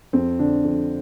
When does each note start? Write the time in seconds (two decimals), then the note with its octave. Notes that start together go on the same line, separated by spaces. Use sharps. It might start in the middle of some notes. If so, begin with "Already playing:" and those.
0.13 F2 C4
0.39 D3 D4
0.64 F2